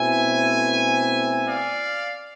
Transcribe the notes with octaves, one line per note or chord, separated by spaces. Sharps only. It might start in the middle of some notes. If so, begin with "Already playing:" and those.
Already playing: B2 A3 C4 E4 E5 G#5
D5 F5